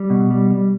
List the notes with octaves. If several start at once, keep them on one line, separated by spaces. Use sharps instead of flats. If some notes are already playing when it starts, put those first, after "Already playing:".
Already playing: G3
B2
G3
G3